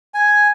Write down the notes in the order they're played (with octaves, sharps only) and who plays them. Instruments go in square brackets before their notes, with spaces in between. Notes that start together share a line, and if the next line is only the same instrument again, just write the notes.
[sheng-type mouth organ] G#5